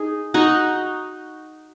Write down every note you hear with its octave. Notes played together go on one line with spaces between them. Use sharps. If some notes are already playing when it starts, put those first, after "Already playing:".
Already playing: D#4 G#4
D#4 F#4